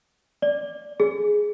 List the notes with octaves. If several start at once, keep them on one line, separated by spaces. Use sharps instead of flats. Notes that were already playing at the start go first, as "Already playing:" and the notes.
D5
G#4